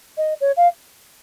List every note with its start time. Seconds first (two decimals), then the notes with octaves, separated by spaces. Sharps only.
0.17 D#5
0.41 C#5
0.57 F5